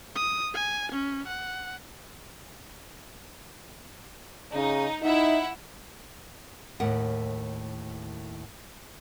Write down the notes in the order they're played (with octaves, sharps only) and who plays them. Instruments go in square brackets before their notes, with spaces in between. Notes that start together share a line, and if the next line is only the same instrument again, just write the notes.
[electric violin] D#6
G#5
C#4
F#5
[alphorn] C#3 [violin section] D#4
[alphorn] D#4 [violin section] E4 E5 F#5
[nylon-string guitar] D#2 A2 A#4 F#5